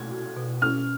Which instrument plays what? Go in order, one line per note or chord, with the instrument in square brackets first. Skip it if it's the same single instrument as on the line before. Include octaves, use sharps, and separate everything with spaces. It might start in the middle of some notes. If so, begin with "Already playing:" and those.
Already playing: [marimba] B2 [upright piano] G#6
[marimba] F#4
B2
[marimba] C#4 [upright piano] F6